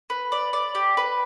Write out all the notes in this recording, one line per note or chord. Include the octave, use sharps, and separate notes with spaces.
B4
D5
D5
G4
B4